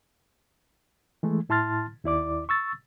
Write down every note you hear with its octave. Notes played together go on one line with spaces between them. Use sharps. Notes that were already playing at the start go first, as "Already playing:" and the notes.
E3 G#3 A3
A2 E4 A5 C6 F6 A6
D#2 E4 D5 D6
C#6 E6 A6